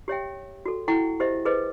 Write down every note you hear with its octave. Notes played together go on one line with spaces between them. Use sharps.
G4 C#5 E5 G5
F#4 A4
E4 A4 F#5 G5 C#6
G4 C5 D#5 E5
G#4 B4 C5 D#5